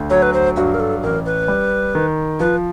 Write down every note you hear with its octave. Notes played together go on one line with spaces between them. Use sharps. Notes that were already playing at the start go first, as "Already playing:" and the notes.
Already playing: D2
F#3 C#5
B4
C5
G2 F#4
A#4
A4
A1 A#4
B4
G3
D#3
F3 B4